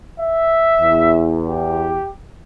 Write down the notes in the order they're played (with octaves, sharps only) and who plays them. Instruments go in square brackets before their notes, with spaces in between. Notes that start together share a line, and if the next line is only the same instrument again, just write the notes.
[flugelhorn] E5
[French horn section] E2
[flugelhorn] G4